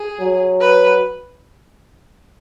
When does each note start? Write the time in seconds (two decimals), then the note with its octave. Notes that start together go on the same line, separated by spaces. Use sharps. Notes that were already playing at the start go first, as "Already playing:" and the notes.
Already playing: G#4
0.20 F#3
0.60 B4